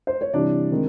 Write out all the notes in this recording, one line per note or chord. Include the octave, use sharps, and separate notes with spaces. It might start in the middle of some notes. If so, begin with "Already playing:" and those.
C5
C#5
C3 E3 G3 D4 D5
D#3 G#3 C4